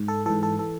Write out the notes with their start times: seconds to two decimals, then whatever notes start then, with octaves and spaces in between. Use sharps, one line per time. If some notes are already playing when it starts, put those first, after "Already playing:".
Already playing: G#2
0.08 A4
0.26 G#2 E3 A4
0.43 A4
0.59 E3 A4